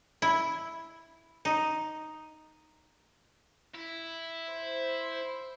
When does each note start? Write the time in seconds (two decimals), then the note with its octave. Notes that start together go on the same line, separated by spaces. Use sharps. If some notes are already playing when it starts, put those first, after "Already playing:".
0.22 E4
1.45 D#4
3.75 E4
4.51 C5